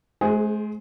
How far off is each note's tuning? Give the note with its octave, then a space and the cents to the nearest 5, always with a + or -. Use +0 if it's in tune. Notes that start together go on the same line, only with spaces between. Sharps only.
G#3 +45 G#4 +5 C5 +0